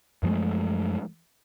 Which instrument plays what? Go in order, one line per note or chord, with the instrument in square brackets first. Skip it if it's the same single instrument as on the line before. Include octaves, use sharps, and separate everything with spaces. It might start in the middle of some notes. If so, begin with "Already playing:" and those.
[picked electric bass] F#2 F3 G#3 A3